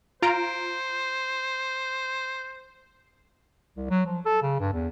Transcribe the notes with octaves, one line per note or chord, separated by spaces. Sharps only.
F4 C5 A#5 D7
C2
F#3
F3
A4
C#3
G2
E2